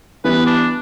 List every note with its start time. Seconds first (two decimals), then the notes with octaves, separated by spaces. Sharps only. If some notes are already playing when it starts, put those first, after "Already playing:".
0.24 E3 G3 B3 B4
0.46 D4